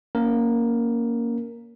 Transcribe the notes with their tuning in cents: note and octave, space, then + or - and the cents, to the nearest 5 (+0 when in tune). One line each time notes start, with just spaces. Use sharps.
A#3 +0 C#4 +20 A#4 +0